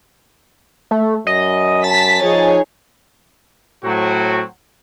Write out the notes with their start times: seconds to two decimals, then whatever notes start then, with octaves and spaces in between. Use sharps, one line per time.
0.91 A3
1.27 F#2 D#5
1.84 A5 A6 B6
2.22 F3 D#4 G#4 C#5
3.83 A2 F#3 C4 F#4